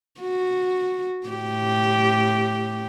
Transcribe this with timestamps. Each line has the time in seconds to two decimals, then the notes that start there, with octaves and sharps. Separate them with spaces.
0.20 F#4
1.27 A2 G4